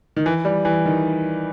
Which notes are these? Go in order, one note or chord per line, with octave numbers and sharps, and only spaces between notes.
D#3
E3
G3
E3
D#3